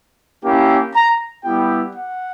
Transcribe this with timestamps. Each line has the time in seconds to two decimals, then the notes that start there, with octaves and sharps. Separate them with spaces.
0.43 A#3 C#4 E4 G4
0.94 A#5
1.44 G3 B3 E4 G4 G5
1.96 F#5